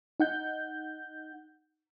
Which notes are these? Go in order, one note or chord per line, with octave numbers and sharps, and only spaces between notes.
D#4 F#5 G6